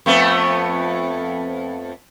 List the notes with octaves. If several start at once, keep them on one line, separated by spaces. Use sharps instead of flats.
F2 A3 B3